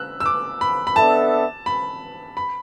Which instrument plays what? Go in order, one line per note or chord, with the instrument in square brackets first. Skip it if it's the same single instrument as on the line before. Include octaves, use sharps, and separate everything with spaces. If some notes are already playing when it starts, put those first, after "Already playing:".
Already playing: [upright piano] E6 F#6
E6
D6
B5
B5
[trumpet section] B3 D4 A4 E5 [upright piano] A5
[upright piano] B5
B5